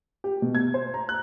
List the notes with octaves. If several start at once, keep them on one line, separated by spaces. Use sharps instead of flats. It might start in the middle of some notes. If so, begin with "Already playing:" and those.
G4
B2
G#6
C5
A#5
F#6